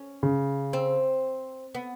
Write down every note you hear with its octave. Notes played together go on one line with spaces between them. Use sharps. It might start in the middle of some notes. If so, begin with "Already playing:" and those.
Already playing: C#4
C#3
C4
B3